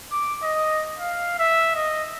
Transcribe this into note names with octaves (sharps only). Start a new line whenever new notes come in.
D6
D#5
F5
E5
D#5